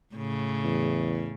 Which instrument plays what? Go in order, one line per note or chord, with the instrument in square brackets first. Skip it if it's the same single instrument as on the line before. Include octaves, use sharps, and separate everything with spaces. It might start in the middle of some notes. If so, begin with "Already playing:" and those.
[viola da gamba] A2 C#3
[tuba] E2